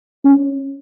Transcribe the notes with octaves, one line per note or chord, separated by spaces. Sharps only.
C#4